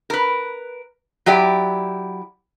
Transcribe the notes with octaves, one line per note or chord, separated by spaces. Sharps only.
A#4 B4
F#3 E4 G4 D5